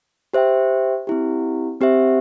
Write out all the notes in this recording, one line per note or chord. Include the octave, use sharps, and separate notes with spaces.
G4 C5 E5 G5
C4 E4 G4
C4 G4 C5 E5